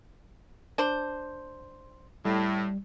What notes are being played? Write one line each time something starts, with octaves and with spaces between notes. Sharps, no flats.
D4 C5
A2 G3